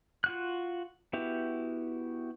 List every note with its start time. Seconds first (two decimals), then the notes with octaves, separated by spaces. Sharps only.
0.24 F4 F#4 F#6
1.13 B3 E4 F#4 G4